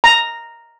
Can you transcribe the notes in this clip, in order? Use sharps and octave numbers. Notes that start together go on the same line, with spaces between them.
A#5